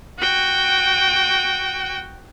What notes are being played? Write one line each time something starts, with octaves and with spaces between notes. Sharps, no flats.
F#4 G5